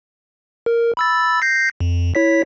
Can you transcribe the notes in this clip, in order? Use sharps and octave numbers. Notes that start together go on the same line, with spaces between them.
A#4
B5 E6 A6
G6 A#6 C7
F2
E4 C#5 B6